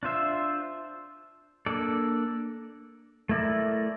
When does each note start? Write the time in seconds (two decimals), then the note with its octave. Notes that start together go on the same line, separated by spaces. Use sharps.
0.03 D4 F4 C5 E5
1.66 A#3 D4 A4 D5
3.29 A3 E4 A#4 D5